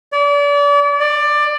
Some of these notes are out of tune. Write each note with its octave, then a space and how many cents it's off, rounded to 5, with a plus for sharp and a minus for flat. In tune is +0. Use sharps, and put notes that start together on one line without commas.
D5 -35
D5 +15